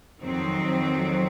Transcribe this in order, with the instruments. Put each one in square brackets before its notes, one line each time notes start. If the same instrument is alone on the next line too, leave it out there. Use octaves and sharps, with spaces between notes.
[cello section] F2 D#3 F#3 C4